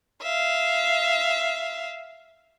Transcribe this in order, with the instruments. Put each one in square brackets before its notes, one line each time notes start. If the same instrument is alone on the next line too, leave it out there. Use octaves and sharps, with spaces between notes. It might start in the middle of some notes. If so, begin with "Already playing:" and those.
[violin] E5 F5